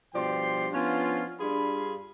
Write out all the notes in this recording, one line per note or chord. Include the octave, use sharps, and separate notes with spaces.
G2 B2 F3 D5 G5 C6
F3 B3 C#4 D4 F4
G2 D4 F4 G#4 B5